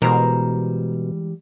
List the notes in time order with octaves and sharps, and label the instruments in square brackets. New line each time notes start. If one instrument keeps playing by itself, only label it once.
[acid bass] B2 [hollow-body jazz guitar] E3 G3 G#3 [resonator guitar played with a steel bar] A#4 C5 A#5